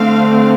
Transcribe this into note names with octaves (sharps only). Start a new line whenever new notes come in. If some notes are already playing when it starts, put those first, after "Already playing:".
Already playing: D3 A3 C4 F5